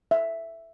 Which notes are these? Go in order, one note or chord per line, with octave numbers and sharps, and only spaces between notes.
E5